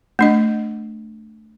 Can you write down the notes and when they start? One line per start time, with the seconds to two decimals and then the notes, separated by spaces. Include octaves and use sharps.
0.19 A3 D4 D#5